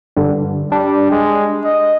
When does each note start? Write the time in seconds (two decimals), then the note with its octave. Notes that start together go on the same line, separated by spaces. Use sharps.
0.17 G2 D3
0.72 G3 D4
1.11 G#3
1.64 D#5